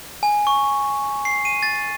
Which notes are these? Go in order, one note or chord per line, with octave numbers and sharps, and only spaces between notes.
G#5
C#6
C7
D#7
A6